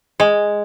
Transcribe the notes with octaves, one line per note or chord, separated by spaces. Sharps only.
G#3